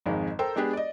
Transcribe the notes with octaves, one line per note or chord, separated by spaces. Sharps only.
G#1 F2 D#3 G#3
A4 A#4 C5 G5
G#3 B3 D4 G4 G#4
D5 D#5